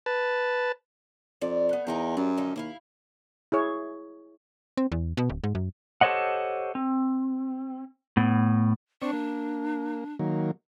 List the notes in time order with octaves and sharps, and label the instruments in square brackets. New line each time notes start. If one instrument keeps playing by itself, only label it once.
[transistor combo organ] B4 A5
[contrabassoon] F2 [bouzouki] D5
[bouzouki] A3 B3
[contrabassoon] E2 [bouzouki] D#4 A#4 G5
[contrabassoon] F#2 [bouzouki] G3
[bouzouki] D3 F3 D#4
[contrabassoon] D#2 [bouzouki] D4 E4 F5
[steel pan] E4 G#4 C#5
[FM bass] C4
E2
B2
D1
G#2
F#2
[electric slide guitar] G4 A4 C5 C#5 D#5 F#5
C4
A2 B3
[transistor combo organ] C4 D5 C#6 [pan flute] D4
[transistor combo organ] A#3
D#3 F#3 A#3